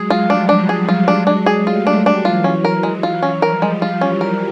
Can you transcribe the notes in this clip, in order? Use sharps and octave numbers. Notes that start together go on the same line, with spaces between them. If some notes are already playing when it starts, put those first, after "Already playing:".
Already playing: F#3 G#3 G#4
F4
F3 G3
D4
F#3 G#3 D4
G#4
F4
D4
D4
G#4
G3 A3 F4
D4
F#3 G#3
D4
E3 F#3 F4
C#4
A#4
G#3
F4
C#4
F3 G3 A#4
G#3
F4
E3 F#3 C#4
A#4